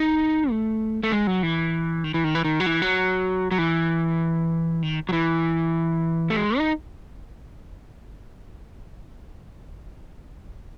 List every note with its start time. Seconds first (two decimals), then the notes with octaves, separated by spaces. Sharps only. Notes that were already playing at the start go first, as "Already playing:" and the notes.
Already playing: D#4
0.50 A3
1.03 A3
1.12 G#3
1.27 F#3
1.43 E3
2.04 D#3
2.14 E3
2.24 D#3
2.35 E3
2.45 D#3
2.60 F#3
2.66 E3
2.82 F#3
3.51 F#3
3.58 E3
4.83 D#3
5.09 F#3
5.13 E3
6.30 A3
6.36 G#3
6.58 D#4